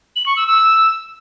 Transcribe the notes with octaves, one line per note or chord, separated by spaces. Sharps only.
F#7
C#6
E6
E6